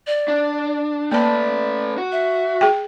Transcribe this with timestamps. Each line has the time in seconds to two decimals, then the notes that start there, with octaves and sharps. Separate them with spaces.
0.07 D5
0.28 D4
1.12 A3 A#3 B4 D5 A5
1.98 F#4
2.12 E5
2.61 G#4 G5